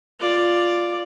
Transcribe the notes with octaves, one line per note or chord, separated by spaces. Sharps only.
F4 D5